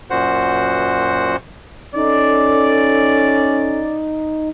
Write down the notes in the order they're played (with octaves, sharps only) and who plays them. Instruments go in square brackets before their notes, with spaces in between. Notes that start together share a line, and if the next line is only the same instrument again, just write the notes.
[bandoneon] F#2 A#2 F#4 C5 F#5
[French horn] C#4 [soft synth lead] D#4 [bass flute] A4 [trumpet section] D5